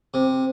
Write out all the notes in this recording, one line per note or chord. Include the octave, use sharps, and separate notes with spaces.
C3